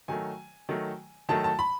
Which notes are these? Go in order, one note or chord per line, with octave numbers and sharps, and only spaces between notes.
D#3 F#3 A3 G#5
D#3 F#3 A3
D#3 F#3 A3 A5
A5
B5